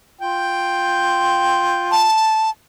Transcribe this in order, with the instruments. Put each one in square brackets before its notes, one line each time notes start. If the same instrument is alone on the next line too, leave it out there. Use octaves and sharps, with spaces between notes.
[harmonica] F4 G5
[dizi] A5